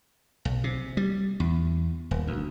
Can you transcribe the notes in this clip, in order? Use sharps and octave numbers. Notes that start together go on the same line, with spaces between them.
B1
C3
G3
E2
D#1
D2